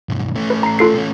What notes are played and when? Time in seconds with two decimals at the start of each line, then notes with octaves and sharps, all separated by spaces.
0.09 B1 G2
0.35 A3 C#4
0.50 B4
0.63 A#5 C7
0.79 F4 A4 C7
0.95 A3 C#4